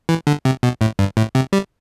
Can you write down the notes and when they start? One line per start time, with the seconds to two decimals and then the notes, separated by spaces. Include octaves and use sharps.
0.09 E3
0.27 D3
0.45 C3
0.63 B2
0.81 A2
0.99 G2
1.17 A2
1.35 C3
1.53 G3